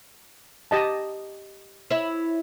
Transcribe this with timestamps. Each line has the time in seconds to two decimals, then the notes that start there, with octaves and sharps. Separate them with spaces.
0.71 G4 D#5 A5
1.90 E4 C#5 E5